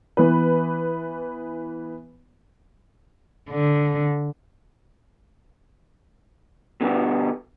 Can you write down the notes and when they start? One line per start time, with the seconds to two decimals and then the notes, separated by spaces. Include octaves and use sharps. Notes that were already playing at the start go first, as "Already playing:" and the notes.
0.17 E3 B3 B4
3.51 D3
6.81 B2 D3 G3 B3